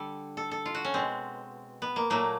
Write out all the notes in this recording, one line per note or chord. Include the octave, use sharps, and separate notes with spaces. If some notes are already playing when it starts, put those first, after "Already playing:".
Already playing: D3 G3 A4
A4
A4
F4
F#4
C#4
B2 G#3 C4
B3
A#3
A#2 F#3 A3 A#3